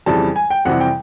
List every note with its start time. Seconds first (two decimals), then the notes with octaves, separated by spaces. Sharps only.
0.06 F2 C#3 E3 G3 A5
0.36 G#5
0.50 G5
0.65 F2 C3 E3 G3 F#5
0.80 G5